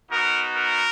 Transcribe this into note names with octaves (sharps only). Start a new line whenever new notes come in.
B3 D#4 F#4 A#4
A#4